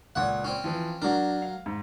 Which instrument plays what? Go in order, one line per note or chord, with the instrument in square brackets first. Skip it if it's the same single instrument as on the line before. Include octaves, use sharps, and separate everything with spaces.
[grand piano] C#2 A#2 [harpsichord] C#5 F#5
[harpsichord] C4 C#4
[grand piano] E3 F3
[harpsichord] F#3 A#4 [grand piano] D4
[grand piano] F5
G#2